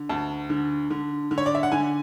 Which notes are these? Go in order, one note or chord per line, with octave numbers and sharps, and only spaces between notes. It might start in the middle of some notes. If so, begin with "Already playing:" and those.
Already playing: D3
D2 A5
D3
D3
D3
C#5
D5
E5
F#5
D3 G#5